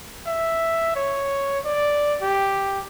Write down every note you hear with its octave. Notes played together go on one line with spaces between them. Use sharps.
E5
C#5
D5
G4